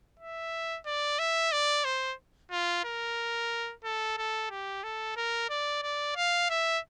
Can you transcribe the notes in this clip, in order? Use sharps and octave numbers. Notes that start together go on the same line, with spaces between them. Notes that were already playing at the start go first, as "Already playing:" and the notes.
E5
D5
E5
D5
C5
F4
A#4
A4
A4
G4
A4
A#4
D5
D5
F5
E5